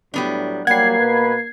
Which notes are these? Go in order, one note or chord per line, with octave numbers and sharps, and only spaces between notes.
A2 F#3 G3 B3 D4
F#3 G3 A#3 F#5 G#6 C7
B2 B4